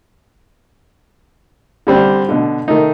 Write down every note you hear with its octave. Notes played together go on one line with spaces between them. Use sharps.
D3 G3 C4 D4
B2 D3
D#3 A3 D#4